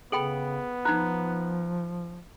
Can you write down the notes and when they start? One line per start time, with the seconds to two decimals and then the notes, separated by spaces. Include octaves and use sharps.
0.12 C#3 B3 G#4 A4 G5 B5 D7 F#7
0.85 F3 D#4 F4 A#5 F#6